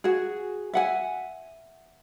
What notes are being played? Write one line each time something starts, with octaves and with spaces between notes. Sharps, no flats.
F#4 G#4
E5 F#5 G#5